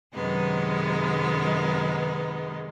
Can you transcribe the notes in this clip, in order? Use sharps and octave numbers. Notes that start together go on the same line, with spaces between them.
F#2 C3 D#3 G#3 B3 D#4